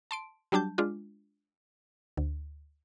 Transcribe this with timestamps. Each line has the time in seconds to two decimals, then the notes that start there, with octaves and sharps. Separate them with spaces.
0.11 A5 C6 D7
0.52 F#3 G3 D4 A5 G6
0.78 G#3 D4 F4
2.17 D2